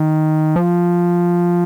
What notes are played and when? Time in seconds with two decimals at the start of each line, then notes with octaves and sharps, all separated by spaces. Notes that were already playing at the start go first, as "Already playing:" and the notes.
Already playing: D#3
0.56 F3